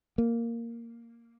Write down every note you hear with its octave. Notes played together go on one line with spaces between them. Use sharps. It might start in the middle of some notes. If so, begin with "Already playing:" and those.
A#3